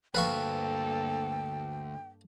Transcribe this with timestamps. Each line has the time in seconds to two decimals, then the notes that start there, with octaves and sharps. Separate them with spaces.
0.15 D2 G2 A#3 A4 B4 F5 G5 C#6